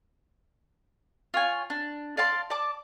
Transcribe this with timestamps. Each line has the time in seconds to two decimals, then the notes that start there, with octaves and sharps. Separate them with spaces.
1.34 F4 C#5 G#5
1.70 D4
2.17 D5 F5 A5 C6
2.50 D5 A5 D6